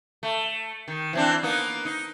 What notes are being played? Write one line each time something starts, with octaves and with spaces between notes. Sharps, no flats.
A3
D#3
E3 C4 D4
A#3 B3 D#4
D#4